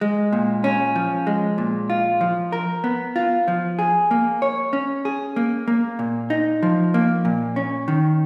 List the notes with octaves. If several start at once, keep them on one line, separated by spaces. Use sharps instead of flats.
G#3
A#2
C#4
F3
G#3
A#2
F4
F3
A#4
B3
F4
F3
G#4
A#3
C#5
C#4
G#4
A#3
A#3
A#2
D#4
F3
A#3
A#2
C#4
D#3